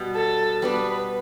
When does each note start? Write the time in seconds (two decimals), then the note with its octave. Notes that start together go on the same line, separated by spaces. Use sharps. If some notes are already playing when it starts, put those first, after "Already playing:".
Already playing: B2 G3 B3
0.16 A4
0.62 G3 B3 D4 B4